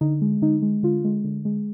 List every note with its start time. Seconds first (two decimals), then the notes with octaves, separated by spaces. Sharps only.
0.01 D3 D#4
0.21 G#3
0.42 D3 D#4
0.62 G#3
0.83 D3 F4
1.04 G#3
1.24 D3
1.45 G#3